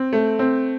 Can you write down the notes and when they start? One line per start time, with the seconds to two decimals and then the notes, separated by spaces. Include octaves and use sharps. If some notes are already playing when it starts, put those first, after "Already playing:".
Already playing: C4
0.13 A3
0.39 C4